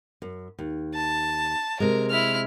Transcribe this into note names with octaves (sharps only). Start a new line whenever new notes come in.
F#2
D#2
A5
C3 G#3 A#4
E4 F6